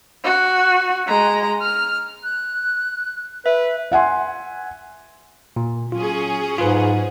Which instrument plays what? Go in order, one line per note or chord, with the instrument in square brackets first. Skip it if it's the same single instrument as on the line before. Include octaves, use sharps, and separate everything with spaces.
[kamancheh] F#4
G#3 A#5
F6
[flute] F#6
[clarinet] B4 [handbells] E5
[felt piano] E5 F#5 G#5 C6
[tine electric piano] A#2
[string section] F#3 C#4 G#4 [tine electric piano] F4
[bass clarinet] G#2 [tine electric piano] F4 B4